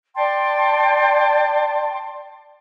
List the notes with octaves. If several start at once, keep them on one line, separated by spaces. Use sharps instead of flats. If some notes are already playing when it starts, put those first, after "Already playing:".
D5 G5 A5 C6